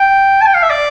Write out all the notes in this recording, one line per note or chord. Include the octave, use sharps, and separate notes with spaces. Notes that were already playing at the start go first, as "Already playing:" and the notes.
Already playing: G5
A5
G5
F5
E5
D5